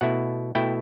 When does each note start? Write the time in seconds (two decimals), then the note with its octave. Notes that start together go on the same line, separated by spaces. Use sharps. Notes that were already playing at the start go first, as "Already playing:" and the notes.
0.01 B2 A3 E4 F#5
0.55 B2 A3 E4 G5